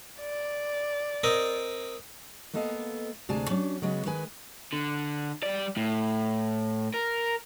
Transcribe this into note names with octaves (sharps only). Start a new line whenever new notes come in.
D5
C4 A#4 D#5
G#3 A#3 B3 A4 D#5 F5
D2 C3 G#3 D5 G#5 A5
F#3 C#4 D4
C#3 F#3 G#3 B3
D#3 G#3 B4 G#5
D3
G3 D5
A2
A#4